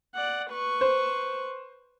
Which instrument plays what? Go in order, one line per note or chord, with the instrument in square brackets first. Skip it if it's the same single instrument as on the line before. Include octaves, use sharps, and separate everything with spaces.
[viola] D5 F#5
B4 C#6
[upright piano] C5